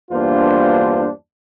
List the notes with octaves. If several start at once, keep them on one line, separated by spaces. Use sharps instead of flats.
E2 G2 A#3 D4 F4 C5